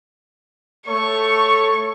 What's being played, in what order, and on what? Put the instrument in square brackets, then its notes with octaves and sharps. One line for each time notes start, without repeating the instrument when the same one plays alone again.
[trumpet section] A3 A4 C#5 [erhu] C#6